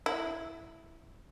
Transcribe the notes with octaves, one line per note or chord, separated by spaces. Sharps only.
E4